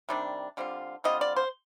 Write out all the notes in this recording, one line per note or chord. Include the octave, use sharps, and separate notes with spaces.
C3 D#3 G3 D4
D3 G3 C4 F4
D3 G3 C4 F4 D#5
D5
C5